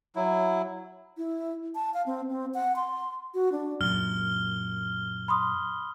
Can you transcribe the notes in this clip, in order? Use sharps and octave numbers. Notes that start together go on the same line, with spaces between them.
F#3 E4
E4
A5
F5
C4
C4
F#5
C6
F#4
D4
F#2 A#2 F6 G7
B5 C6 D#6